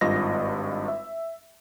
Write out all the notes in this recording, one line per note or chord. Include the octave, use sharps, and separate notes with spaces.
G#1 G2 F4 D#5 A#6
E5